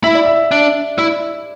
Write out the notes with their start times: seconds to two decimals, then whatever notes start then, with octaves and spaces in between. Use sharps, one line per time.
0.04 E4 E5
0.15 D5
0.26 E5
0.51 D4
0.98 E4 D5